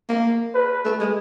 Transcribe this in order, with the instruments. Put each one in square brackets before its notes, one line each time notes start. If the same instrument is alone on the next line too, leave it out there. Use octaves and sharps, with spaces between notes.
[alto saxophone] A#3
[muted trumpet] B4
[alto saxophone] A3
G#3